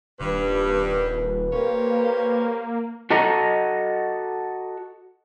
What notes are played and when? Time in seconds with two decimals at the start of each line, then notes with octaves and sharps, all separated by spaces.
0.20 D#1 G2 B4
1.53 A#3 G4 C5 C#5
3.10 F#4 A4 D#5 A#5